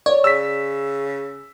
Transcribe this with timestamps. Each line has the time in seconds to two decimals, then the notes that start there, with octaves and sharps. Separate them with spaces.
0.06 C#5 D5
0.24 C#3 E6 B6